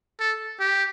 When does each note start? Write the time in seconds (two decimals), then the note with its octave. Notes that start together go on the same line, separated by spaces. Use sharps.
0.20 A4
0.60 G4